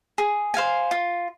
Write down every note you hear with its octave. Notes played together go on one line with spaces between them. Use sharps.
G#4
C5 F5 G#5
F4